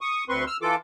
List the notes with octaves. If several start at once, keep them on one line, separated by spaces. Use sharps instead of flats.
C#6 D#6
D2 C4 B4 C6 C#6
E6 F6
E3 F4 A4 D6